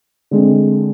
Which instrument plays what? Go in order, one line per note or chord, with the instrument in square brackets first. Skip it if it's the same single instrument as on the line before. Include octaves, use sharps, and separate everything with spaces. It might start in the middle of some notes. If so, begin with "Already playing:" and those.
[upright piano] D3 G#3 C4